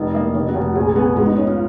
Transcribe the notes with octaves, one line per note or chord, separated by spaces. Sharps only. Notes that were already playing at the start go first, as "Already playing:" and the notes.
Already playing: F1 D#4
A#3
F1 D#4
F#4
F1
F#4
A#1 G#4
B3 G#4
G#2 F#4
D#4
C#4 D#4
F4